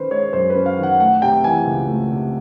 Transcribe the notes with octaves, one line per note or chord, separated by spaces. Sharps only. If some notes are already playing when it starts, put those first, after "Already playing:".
Already playing: D#3 C#4 B4 C5
G#3 C#5
F#2 C5
B4
C#4
F5
D#3
F#5
A3 F#5
C3 G5
E3 G#5
C#2
A3
C3